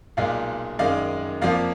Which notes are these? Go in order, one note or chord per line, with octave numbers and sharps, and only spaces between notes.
B1 A#2 G#3 D5 F5
F#2 D#3 G#3 D5 F5
F2 F3 A#3 D5 F5